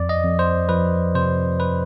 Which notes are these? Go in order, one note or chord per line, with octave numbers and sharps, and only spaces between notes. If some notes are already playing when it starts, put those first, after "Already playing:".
Already playing: F2 D5
D#5
F2
C5
F3 B4
C3 C5
B4